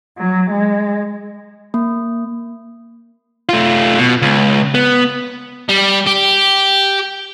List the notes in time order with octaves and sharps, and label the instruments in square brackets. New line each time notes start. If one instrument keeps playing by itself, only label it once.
[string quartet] F#3
G#3
[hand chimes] A#3
[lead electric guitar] A3 F4
B2
C#2
B3
[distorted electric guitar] G3
G4